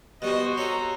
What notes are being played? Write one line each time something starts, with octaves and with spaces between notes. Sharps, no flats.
B2 G3 F#4 C5 D#5
C#4 A4 A#5